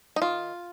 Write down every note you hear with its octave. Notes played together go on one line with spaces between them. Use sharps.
D#4
D#3 F4